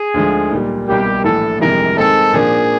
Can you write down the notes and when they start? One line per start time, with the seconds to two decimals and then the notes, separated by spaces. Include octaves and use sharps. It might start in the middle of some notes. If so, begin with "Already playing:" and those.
Already playing: G#4
0.14 D2 D3 F3 G#3
0.51 B1 A#2 G3
0.87 C2 B2 G3 A#3 G4
1.24 A#1 A2 E3 A4
1.60 G1 F2 C3 E3 G#3 A#4
1.97 G#2 D#3 G#3 C4 D#4 A4
2.33 A#2 F3 A#3 D4 G#4